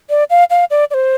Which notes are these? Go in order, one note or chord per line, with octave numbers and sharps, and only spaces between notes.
D5
F5
F5
D5
D5
C5